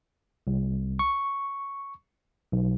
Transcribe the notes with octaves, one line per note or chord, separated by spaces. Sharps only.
C2
C#6
B1